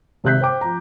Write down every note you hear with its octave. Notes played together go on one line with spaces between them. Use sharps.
G#1 C3 E5 F#6 G6 B6
C5 G5 D6
F3 A#5